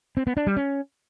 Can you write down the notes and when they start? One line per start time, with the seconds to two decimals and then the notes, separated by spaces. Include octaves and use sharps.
0.17 C4
0.27 B3
0.37 D4
0.47 G3
0.57 C#4